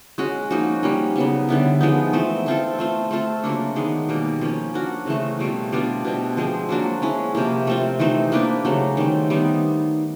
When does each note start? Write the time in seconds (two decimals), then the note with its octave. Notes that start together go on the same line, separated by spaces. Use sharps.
0.18 G#3 C#4 F#4
0.51 F3 A#3 D#4 F#4
0.83 G3 A#3 C#4
1.16 C#3 F#3 B3
1.48 D3 G3 B3 E4
1.81 F3 G#3 B3 D#4
2.13 E3 A3 C4
2.46 A3 C4 F4 A4
2.79 A3 C4 F4
3.11 A3 C4 F4 A4
3.44 C#3 F#3 A#3 D4
3.76 D#3 G#3 B3
4.09 B2 G3 A#3
4.41 F3 A#3 C#4
4.74 A#3 D4 F#4 A#4
5.06 C#3 E3 A3 C4
5.39 B2 G3 C4 F4
5.72 G3 B3 D4 F4
6.05 B2 G3 C4
6.37 F3 G#3 C4
6.69 F#3 A#3 D4 F#4
7.02 G#3 C#4 E4
7.35 C3 F3 A#3
7.67 A3 C4 F4
8.00 E3 A3 C4 D#4
8.32 A#3 D4 G4 B4
8.65 C#3 F#3 A3
8.97 D#3 G3 C4
9.30 G3 B3 D#4